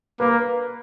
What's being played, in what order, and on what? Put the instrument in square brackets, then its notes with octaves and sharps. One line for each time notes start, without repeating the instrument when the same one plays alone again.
[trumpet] A#3 [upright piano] B4